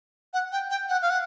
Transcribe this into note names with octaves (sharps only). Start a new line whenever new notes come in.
F#5
G5
G5
F#5
F5
F#5